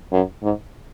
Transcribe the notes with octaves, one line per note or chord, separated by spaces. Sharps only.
F#2
G#2